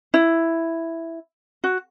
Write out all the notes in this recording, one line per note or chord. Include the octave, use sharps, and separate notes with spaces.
E4
F#4